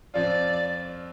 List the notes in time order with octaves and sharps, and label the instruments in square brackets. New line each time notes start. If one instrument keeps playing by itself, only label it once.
[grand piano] F2 F3 C4 F4 [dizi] D5